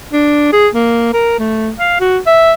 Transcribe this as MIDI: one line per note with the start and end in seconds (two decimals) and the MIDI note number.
0.13 0.51 62
0.53 0.68 68
0.74 1.11 58
1.14 1.35 70
1.39 1.71 57
1.79 1.98 77
2.01 2.18 66
2.27 2.53 76